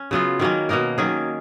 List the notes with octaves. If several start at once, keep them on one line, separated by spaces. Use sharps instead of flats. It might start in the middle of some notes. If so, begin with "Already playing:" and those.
Already playing: C#4
C#3 F#3 B3 F4
D#3 F#3 A#3 C#4
B2 A#3 D#4 A#4
D#3 F#3 C#4 G#4